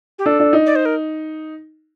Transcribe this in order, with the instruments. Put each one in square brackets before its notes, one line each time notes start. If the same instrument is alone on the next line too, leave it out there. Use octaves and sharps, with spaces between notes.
[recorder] G4
[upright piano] D4 [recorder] A4
[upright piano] D4
D#4
[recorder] D5
C5
A#4